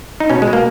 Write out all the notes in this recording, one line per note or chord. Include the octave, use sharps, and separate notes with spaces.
D#4
B2 C#4
G#3
B2
A#3